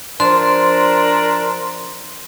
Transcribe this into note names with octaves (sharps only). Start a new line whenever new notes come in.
F3 D4 A#4 C6